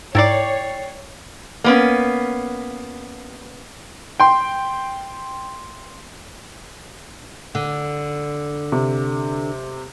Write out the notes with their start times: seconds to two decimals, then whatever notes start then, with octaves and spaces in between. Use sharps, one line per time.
0.15 G#2 E4 A#4 C#5 D5 G5 A6 C7
1.64 A#3 B3 C#4
4.20 G5 C6
7.55 D3
8.72 C3